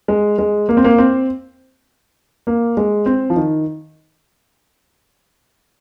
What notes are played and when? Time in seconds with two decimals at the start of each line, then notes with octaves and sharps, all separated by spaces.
0.08 G#3
0.38 G#3
0.69 A#3
0.77 C4
0.84 A#3
0.98 C4
2.47 A#3
2.77 G#3
3.06 C4
3.30 F3
3.36 D#3